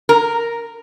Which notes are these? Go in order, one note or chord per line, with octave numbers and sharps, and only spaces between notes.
A#4